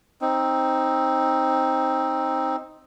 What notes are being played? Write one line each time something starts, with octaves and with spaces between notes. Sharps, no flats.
C4 D#4